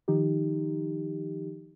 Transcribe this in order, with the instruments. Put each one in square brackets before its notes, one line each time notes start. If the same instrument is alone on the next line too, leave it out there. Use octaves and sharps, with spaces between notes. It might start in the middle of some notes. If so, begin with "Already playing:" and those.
[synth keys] D#3 F3 D#4 G4